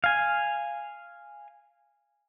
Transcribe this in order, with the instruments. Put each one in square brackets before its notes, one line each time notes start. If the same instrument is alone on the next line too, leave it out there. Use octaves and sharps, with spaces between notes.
[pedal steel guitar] F5 G#5